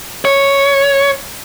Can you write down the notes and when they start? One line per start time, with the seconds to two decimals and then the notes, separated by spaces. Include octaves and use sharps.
0.25 C#5